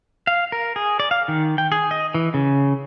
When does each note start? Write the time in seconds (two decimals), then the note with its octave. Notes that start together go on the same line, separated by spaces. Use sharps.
0.27 F5
0.52 A#4
0.76 G#4
1.00 D5
1.11 F5
1.28 D#3
1.58 G5
1.72 G#4
1.91 D#5
2.14 E3
2.34 C#3